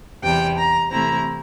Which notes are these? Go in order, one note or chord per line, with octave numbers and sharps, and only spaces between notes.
E2 C3 G3 G5
A#5
C3 E3 A3 C4 E4 A#5